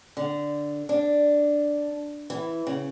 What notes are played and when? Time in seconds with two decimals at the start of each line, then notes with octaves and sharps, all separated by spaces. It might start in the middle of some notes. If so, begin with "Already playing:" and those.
0.17 D3
0.89 D4
2.30 E3
2.67 C#3